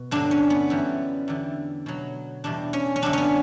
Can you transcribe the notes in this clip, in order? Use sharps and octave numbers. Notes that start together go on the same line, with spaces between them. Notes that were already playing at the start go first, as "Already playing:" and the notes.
Already playing: B2
G2 D3 F#3 D4
C#4
B3
F#2 E3 G3
E2 D3 G3
B2 F#3
E2 B2 G3 D4
C#4
C#4
F#2 D3 G3 D4
B3 C#4